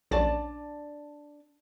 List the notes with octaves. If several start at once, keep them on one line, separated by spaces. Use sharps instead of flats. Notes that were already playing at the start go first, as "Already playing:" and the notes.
A#1 C#4 D4 D5 A5 A6